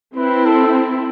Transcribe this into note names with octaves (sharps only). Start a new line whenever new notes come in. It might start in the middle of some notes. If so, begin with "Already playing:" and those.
C4 E4 B4
A4